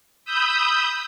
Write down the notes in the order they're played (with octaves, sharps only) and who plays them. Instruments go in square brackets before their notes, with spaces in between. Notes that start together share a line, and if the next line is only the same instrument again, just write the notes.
[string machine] B5 D#6 E6 G6